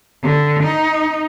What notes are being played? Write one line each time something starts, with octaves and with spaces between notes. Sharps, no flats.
D3
D#4